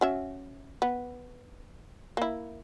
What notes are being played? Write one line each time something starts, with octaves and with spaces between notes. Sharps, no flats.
F#3 C#4 E5
B3
A#3 E4